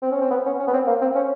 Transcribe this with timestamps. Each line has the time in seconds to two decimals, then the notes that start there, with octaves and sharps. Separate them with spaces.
0.02 C4
0.12 C#4
0.21 C4
0.31 B3
0.46 C#4
0.59 C#4
0.67 B3
0.73 C4
0.87 A#3
1.01 C4
1.15 C#4